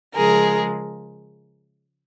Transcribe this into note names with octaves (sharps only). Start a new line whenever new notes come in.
C#3 F3 G#3 G#4 A#4